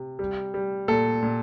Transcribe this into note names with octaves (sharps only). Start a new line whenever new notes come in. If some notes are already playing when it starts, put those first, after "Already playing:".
Already playing: C3
G3
G3
A#2 A4
A#2